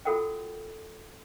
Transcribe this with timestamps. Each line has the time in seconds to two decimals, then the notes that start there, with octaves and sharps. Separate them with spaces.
0.05 F4 F#4 A4 A#4 F#5 G5